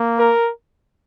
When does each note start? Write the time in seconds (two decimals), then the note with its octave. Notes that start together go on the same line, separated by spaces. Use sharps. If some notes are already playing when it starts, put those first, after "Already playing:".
Already playing: A#3
0.19 A#4